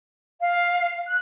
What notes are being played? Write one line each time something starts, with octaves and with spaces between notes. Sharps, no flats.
F5
F#6